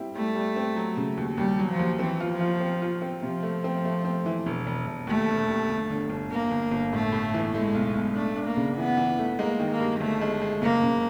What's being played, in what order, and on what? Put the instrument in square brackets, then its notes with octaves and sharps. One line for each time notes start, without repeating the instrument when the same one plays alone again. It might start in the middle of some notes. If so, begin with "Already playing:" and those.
Already playing: [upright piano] G3 C4 E4
[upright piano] G3 [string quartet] A3
[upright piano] G3
C4
F#3
C#3
D#2
[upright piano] D#2 [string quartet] G3
[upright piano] F#3
[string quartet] F3
[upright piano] D#2
[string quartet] E3 [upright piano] C4
[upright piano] F4
[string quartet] F3
[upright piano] F4
C4
F4
C4
[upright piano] C3 [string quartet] F3
[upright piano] A3
C4
A3
C4
E3
E1
E1
E1
[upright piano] D#2 [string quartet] A3
[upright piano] E1
D#2
G1
D3
G1
[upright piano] G1 [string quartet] A#3
[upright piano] G1
G1
[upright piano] A2 [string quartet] A3
[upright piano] A2
E3
[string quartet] G#3 [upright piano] A3
[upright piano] B1
B1
[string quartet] A3 [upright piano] D4
[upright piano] D4
[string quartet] A#3
[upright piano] C#3
[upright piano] E3 [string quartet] B3
[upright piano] E3
A3
[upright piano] G#3 [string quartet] A#3
[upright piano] D#3
[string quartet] A#3
[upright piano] G2
[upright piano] G1 [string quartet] A3
[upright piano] G#3
G#3
[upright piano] F#1 [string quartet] A#3
[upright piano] C#3